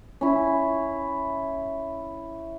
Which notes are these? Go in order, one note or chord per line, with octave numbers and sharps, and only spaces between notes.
C#4 E4